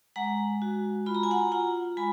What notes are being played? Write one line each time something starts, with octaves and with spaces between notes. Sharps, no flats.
G#3 F#5 A#5
F#4
F4 B5
A#5
G#5
F#5 A#5
F4 F#5 A#5
G#3 G#5 B5